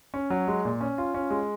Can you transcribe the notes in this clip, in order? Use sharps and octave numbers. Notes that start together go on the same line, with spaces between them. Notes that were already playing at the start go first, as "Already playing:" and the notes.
C#4
F#3
G#3
A#2
C#4
F4
C#4
G#3